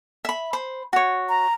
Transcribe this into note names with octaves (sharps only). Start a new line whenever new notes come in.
E5 B5
C5 B5
F#4 C#5
A#5